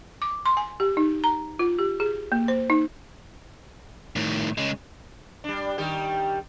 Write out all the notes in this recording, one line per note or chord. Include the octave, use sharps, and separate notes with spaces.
D6
C6
G#5
G4
D#4
A#5
F4
G4
G#4
A#3
C5
D#4
A2 D#3
C#3 G#3
G3 D4
D#3 G3 G4